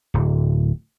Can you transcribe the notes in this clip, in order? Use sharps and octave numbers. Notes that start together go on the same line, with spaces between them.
D1